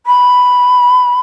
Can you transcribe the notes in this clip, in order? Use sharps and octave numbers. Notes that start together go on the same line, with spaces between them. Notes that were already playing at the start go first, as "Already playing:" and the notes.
B5